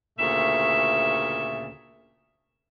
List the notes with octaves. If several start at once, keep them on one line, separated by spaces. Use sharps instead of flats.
D2 A#2 C#3 A3 E5